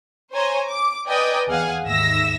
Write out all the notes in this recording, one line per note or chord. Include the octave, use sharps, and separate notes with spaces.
C5 C#5 G#5 A#5 C6
D6
B4 D5 D#5 G5 G#5 A#5
E2 G#4 F5 F#5 G#5
D#2 G#2 E5 E6 A#6